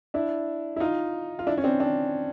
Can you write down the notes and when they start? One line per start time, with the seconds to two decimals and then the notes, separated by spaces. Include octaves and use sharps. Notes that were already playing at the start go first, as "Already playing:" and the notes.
0.14 D4 E4
0.76 E4
0.80 D#4 F4
1.39 F4
1.47 D4 E4
1.58 C#4
1.64 C4 D4
1.80 C4 D4